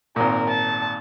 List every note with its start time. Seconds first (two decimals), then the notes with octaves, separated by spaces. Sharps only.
0.16 G#1 A#2 A#4
0.50 A5